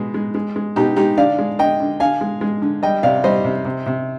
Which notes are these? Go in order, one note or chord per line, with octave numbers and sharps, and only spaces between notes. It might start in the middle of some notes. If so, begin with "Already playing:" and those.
Already playing: B2 G#3
G#3
G#3
G#3
B2 D#4 G4
G#3 D#4 G4
D3 D5 F5
G#3
D3 D#5 G5
D3
D3 F5 G#5
G#3
G#3
D3
G3 D#5 G5
C3 D5 F5
G3 C5 D#5
C3
C3
C3